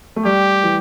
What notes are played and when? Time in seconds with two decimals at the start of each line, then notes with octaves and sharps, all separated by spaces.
0.16 A3
0.25 G3 G4
0.63 E3